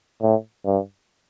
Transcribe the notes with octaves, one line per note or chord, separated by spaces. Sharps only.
A2
G2